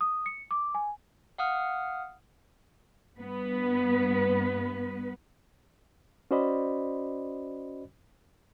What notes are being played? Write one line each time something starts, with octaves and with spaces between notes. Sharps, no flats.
D#6
C#7
D6
G#5
F5 F#5 D#6 F6
G2 B3 B4
C#4 F#4 C5 D5 D#5 B5